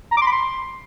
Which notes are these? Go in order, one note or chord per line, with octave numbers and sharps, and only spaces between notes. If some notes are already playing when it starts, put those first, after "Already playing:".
A#5
D6
C6
B5
C6